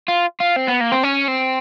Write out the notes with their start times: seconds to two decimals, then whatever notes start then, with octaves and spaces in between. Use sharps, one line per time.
0.08 F4
0.40 F4
0.56 C4
0.68 B3
0.81 A#3
0.92 C4
1.03 C#4
1.28 C4